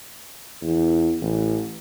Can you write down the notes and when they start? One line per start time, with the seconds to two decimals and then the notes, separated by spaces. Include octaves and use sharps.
0.62 E2
1.21 A1